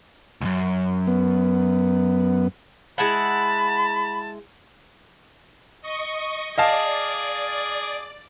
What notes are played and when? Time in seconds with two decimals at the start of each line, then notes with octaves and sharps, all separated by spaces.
0.41 C#2 F#2
1.07 B3
2.98 G#3 E4 F#5 A5 B5
5.82 D#5 C#6
6.58 G#4 D5 D#5 F5 A5